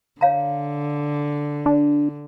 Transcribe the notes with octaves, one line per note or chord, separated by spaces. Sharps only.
D3 C#5 F5 A#5
D4